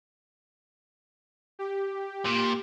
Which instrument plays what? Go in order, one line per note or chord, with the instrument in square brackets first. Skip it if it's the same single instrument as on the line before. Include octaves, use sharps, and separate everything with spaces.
[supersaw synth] G4
[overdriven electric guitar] A#2